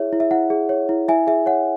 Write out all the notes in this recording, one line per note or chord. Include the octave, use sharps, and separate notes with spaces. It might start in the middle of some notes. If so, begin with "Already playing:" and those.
Already playing: E4 G#4 C#5 E5
E4
E5
E4 F#5
G#4
C#5
E4
E4 E5 G#5
G#4 E5
C#5 F#5